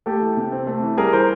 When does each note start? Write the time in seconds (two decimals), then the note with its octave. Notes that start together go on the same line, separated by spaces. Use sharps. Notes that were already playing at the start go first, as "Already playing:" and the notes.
0.06 A3 G4 A4
0.21 E3
0.37 C3
0.52 C4
0.67 A3
0.83 E3
0.98 G3 G#4 A#4
1.13 E3 A#4 C5